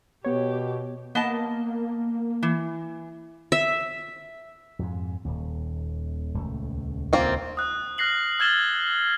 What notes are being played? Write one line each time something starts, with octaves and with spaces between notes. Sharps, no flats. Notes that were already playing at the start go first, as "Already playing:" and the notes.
B2 B3 G4 C#5
A#3 B3 D#5 A5
E3
E5
F2 G#2
D#1 D#2
D#1 C#2 A3
A#3 C4 F4
D#6 F#6
F6 F#6 A#6 C7 F#7
E6 F6 G#6 A6 E7 G7